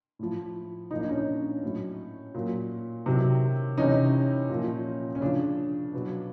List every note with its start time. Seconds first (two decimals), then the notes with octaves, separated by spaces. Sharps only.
0.19 A2 F3
0.91 A#2 F3 D#4
1.00 D4
1.09 C#4 D#4
1.63 A2 F#3
2.34 A#2 F#3
3.06 C3 D#3 F#3
3.78 C3 E3 C#4 D#4
4.50 A#2 F3
5.15 C#4
5.21 C#3 F3 D4
5.94 B2 F#3